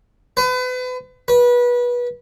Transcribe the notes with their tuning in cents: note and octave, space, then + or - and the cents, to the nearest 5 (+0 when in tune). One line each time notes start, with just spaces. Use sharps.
B4 +35
B4 -25